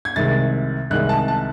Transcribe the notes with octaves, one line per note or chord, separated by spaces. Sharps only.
G#6
C2 C3 D#3 G#3 A6
C2 C3 D#3 G#3 F#6
A5
A5